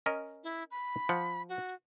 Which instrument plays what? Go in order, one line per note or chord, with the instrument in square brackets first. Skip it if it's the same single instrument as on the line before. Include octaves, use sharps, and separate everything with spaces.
[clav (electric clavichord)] C#4 A#4 D#5
[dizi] E4
B5
[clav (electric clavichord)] F3 F#5
[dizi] F#4